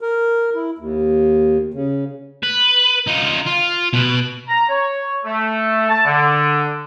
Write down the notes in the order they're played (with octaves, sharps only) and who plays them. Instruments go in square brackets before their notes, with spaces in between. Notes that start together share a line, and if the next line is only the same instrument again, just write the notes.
[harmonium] A#4
E4
D#2
C#3
[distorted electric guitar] B4
D#4 F4
F4
B2 B4
[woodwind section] A#5
C#5
A3
A5
D3